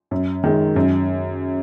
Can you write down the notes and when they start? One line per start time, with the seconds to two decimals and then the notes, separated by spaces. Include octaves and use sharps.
0.11 F#2
0.44 D#3 G#3
0.76 F#2